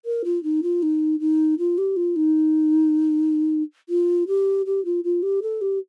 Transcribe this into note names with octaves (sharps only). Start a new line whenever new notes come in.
A#4
F4
D#4
F4
D#4
D#4
F4
G4
F4
D#4
F4
G4
G4
F4
F4
G4
A4
G4